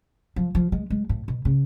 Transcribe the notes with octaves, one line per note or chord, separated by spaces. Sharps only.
F3
F3
G#3
G#3
A2
B2
C#3